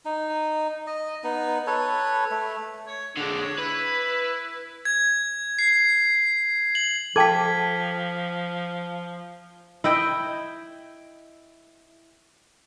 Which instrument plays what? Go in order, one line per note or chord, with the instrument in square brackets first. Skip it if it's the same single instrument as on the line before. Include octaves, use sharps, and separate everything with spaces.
[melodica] D#4
D#5
B3 D#4
A4 B4 C#5
A3
[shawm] C#5
[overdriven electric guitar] D3 G#3 [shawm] D4
[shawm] C#5
[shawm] E4 [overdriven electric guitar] B4
[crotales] G#6
C7
F#7
[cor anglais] F3 [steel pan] A4 [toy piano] G5 A5 D6 [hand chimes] G#6 B6
[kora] E4 D#5 G5